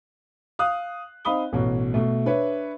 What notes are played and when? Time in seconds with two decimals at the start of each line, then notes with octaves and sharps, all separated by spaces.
0.59 F5 D#6 F#6
1.25 C4 D#4 F5 B5 D#6 G7
1.53 A1 B2
1.94 B2 A3
2.25 D4 B4 C#5 E5